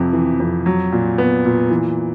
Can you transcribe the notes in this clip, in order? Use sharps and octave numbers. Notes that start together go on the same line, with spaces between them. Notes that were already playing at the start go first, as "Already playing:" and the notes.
Already playing: F2 C3
E3
F2
F#3
A#2
B3
A#2
E3